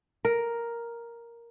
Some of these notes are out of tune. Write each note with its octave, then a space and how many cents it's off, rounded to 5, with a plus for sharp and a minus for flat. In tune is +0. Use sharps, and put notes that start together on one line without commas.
A#4 +5